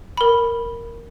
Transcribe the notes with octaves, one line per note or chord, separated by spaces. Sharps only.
A#4 B5